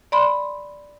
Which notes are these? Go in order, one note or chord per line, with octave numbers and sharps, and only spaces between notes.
D5 B5 C6